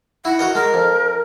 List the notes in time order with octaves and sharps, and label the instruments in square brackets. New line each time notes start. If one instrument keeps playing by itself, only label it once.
[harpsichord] E4 [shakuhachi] F#5
[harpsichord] F#4 A#4 D#5
[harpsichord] G#3 [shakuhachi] A#4
[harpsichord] F2